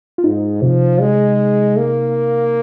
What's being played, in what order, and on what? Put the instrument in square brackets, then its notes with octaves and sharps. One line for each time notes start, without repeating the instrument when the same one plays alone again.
[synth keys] F4
[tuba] G#2 [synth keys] D#4
[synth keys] C3 [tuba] F3
[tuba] G#3
A#3